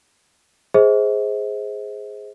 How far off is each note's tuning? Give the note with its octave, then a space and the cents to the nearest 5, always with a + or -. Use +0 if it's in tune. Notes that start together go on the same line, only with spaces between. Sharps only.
G#4 +0 C5 +0 D#5 +45